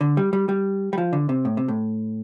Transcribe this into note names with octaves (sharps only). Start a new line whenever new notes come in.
D3
G3
G3
G3
G3
F3
D3
C3
A2
C3
A2